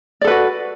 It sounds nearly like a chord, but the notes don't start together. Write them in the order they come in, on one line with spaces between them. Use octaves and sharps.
D5 A4 B4 F#4